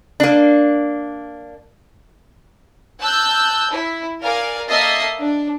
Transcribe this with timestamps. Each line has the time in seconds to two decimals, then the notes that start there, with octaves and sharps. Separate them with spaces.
0.20 A#3 D4
3.01 A5 E6 F#6 G6
3.72 E4
4.22 A#4 D5 F5 G#5
4.69 A#3 A4 D#5 E5 A6 C7
5.18 D4